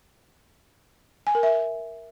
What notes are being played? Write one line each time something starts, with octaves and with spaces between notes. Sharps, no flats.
G#5
A#4
E5